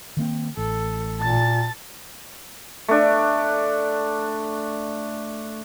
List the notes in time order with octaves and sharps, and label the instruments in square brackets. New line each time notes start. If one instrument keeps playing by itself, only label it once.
[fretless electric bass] D#3 A#3 C4
[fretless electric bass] A1 [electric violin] A4
[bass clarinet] A#2 [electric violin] A5 A6
[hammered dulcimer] A3 D4